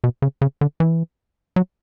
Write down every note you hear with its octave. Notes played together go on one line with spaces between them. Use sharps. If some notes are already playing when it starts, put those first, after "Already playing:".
B2
C#3
C#3
D3
E3
F#3